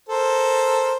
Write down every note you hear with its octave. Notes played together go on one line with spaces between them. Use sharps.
A4 A#4 C5